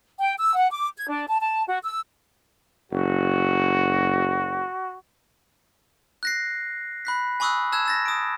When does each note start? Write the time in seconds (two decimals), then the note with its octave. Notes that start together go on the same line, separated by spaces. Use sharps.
0.20 G5
0.39 E6
0.55 F#5
0.70 D6
0.97 G#6
1.09 D4
1.27 A5
1.40 A5
1.67 F#4
1.84 E6
2.92 F#1 F#4
6.23 F#6 A#6 C7
7.05 B5 F#6 B6
7.40 G#5 B5 C#6 D#6 E6 F#6
7.72 A5 E6 F#6 G#6 E7
7.86 E6 A6 A#6
8.06 D#6 D7